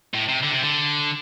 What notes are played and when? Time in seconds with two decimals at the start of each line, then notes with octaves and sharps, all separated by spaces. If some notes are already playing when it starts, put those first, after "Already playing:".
0.14 A2
0.28 C3
0.43 D3
0.52 C3
0.62 D3